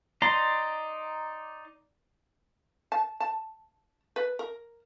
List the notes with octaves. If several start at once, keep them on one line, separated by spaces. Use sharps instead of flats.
D#4 D5 A#5 C6
A5
A5
B4
A#4